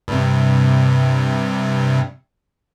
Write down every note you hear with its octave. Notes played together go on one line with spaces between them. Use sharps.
G2 C3